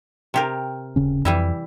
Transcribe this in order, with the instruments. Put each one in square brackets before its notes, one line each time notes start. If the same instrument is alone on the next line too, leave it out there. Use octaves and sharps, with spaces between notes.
[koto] C3 G4 A#4
[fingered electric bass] D#1 C#3 C#4
[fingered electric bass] F2 [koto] E3 G3 E4